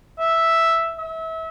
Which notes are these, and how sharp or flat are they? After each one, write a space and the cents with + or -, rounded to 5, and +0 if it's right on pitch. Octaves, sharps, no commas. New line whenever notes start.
E5 +0
E5 -30